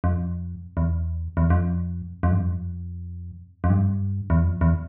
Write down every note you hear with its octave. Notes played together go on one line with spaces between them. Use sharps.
F2
E2
E2
F2
F2
G2
F2
F2
G2
E2
F2
E2